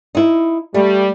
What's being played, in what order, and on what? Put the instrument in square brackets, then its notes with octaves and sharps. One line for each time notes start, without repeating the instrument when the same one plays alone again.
[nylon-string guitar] D#4 E4
[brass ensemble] G3 [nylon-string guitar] A3